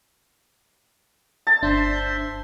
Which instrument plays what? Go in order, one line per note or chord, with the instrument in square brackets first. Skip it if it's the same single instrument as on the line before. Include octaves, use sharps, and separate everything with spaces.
[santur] A5
[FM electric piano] G1 D4 [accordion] C5 E5 C6